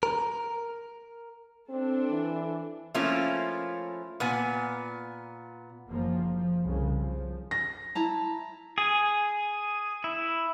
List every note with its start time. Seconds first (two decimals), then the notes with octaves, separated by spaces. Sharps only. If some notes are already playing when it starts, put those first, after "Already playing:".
0.03 A#4
1.69 C4 D4 A4
2.10 E3
2.94 F3 A3 A#3 C#4 E4 F4
4.20 A#2 B3 G#5
5.89 F#1 F3 A#3
6.33 F3
6.64 C2 C#3
7.00 F3
7.51 A#6
7.95 E4 A5 A#5
8.78 G#4 G#5
10.04 E4